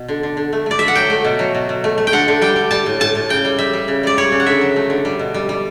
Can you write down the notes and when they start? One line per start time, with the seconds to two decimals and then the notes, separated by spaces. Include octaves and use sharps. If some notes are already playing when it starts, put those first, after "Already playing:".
Already playing: B2
0.08 D3
0.23 D3
0.37 D3
0.53 A3
0.66 A3 D5
0.79 D3 E5
0.88 F#5
0.95 F#3 G5
1.10 A3
1.24 B2
1.39 F#3
1.55 B2
1.69 B2
1.84 A3
1.98 A3
2.07 G5
2.13 D3 F#5
2.28 D3
2.41 G3 G5
2.56 G3
2.71 G3 A5
2.86 A2
3.00 A2 A5
3.15 A2
3.29 C#3 G5
3.45 G3
3.58 G3 E5
3.73 G3
3.88 C#3
4.03 G3 D5
4.17 G3 C#5
4.32 C#3
4.40 F#5
4.46 D3 E5
4.61 F#3
4.76 A3
4.90 D3
5.05 G3
5.19 B2
5.34 G3
5.49 G3